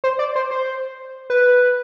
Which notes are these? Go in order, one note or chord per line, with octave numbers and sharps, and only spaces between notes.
C5
D5
C5
C5
B4